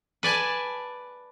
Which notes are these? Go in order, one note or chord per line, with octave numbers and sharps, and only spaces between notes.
B4 D5 G#5 A5